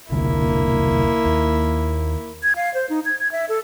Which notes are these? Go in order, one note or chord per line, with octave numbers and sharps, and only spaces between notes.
E1 C2 D3 A#3 E4
D#2
G#6
F5
C5
D#4
G#6
G#6
E5
A4